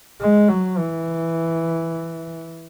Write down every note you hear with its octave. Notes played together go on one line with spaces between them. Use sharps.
G#3
F#3
E3